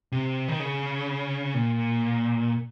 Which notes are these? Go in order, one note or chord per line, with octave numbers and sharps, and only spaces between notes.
C3
D#3
C#3
A#2